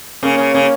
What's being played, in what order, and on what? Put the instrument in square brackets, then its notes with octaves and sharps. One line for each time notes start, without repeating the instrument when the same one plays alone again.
[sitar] C#3 [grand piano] A#3 C#4
[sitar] C#3
[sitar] C#3 [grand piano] A#3 C#4